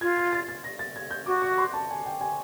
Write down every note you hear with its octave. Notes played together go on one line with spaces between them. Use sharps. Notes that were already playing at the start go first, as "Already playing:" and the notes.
F4 G#6
G#6
A6
A6
A#6
A6
G#6
G6
F#4 D6
C#6
C6
A5
G#5
G5
G#5